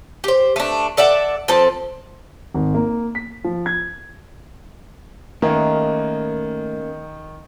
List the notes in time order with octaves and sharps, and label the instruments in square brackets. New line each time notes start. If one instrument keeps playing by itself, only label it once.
[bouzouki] G4 C5
A3 D4
A4 D5 E5 F#5
F3 C4 A4
[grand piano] G#1
A#3
B6
F3
G#6
[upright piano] D#3 [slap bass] A3 [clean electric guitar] A#3 C#4 [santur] D#4